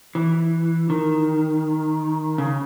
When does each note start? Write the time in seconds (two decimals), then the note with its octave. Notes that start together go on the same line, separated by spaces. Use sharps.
0.15 E3
0.90 D#3
2.38 C#3